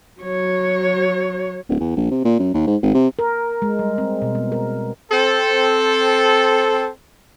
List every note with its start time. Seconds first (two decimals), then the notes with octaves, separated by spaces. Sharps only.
0.21 F#3 C#5
1.69 D1
1.80 E2
1.97 A#1
2.11 C3
2.25 A#2
2.39 F#2
2.54 D#2
2.67 G#2
2.83 G#1
2.94 C3
3.19 A#4
3.62 G#3
3.79 G3
3.98 C4
4.22 B2
4.35 B3
4.52 A#4
5.12 C4 A4